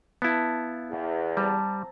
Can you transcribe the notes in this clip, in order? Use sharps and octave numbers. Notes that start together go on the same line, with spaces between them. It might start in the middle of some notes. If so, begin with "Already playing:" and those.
B3 E4 F5 A5
E2
G3 C4 A5 A#5